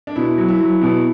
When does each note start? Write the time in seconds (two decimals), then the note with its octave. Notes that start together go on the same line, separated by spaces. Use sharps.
0.07 D4
0.16 B2 E4
0.38 F#3
0.48 E4
0.60 F#3
0.82 B2